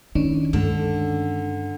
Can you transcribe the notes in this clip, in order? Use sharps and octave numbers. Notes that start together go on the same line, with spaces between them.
D#3 C#4 D4 E4
G2 D3 G#3